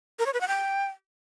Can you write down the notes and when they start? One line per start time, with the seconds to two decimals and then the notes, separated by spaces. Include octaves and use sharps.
0.19 A#4
0.26 C#5
0.33 B4
0.41 F#5
0.48 G5